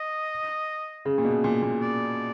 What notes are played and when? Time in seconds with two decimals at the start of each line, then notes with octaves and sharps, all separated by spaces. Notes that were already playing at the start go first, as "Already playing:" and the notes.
Already playing: D#5
1.05 C#3
1.18 A#2
1.25 B2
1.44 A#2
1.62 A#2
1.82 D5